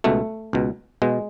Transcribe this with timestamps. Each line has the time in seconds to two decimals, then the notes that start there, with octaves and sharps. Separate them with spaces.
0.04 C#2 B2 A3
0.53 C#2 B2
1.02 B2 G#3